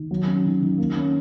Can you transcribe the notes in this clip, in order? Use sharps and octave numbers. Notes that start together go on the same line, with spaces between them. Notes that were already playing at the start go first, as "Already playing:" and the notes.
Already playing: D#3
F#3
C#4
D#3
D#3
A#3
C#4